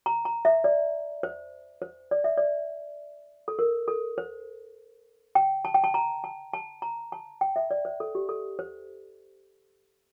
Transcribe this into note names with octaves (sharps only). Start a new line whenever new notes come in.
A#5
A#5
E5
D5
C5
C5
D5
E5
D5
A4
A#4
A4
C5
G5
A5
G5
A5
A#5
A5
A5
A#5
A5
G5
E5
D5
C5
A4
G4
A4
C5